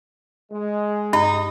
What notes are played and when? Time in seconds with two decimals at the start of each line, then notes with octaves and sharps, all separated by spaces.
0.52 G#3
1.13 G2 D#4